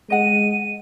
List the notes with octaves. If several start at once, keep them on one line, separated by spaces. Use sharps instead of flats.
G#3 D#5 F#5 D#7